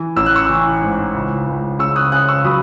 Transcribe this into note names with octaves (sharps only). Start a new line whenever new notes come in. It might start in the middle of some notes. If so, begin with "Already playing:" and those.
Already playing: E3
A1 E6
F#6
C#6 E6
E3
G#2
C#2
C#2
C#3 C#6 E6
D#6 F#6
C#3 D#6 F#6
C#6 E6
F#3 B5 D#6